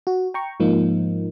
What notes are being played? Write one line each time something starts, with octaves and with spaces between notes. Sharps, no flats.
F#4
G5 A#5 C#6
G#2 F3 A#3 D#4